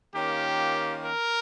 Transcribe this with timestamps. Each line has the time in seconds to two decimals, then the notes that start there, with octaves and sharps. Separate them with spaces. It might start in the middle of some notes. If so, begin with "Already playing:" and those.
0.15 D#3 A#3 C#4 F4 G4
1.05 A#4